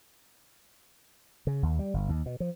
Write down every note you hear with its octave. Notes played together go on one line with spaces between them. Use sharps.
C#3
D#2
G3
G1
D#2
B2
F3